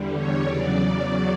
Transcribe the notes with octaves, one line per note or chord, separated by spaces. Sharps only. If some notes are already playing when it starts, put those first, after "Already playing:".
Already playing: E2 D3 G3
C#5
E2 C#3 F#3 D5